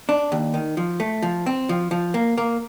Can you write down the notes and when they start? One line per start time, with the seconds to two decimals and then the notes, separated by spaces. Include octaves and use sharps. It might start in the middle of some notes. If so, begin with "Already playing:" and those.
0.09 D4
0.32 D#2
0.54 D#3
0.77 F3
1.00 A3
1.23 F3
1.46 C4
1.69 F3
1.91 F3
2.14 A#3
2.38 A#3